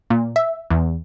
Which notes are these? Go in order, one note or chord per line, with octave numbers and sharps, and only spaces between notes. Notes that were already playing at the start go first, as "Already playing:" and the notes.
A#2
E5
E2